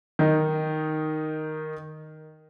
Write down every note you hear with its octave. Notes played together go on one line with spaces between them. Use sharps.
D#3 D#4